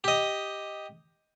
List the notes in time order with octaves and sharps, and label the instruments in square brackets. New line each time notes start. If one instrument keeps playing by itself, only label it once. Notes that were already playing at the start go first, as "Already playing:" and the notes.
[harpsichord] G4 D#5